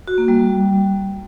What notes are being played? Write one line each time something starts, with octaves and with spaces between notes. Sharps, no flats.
F#4
A#3
G3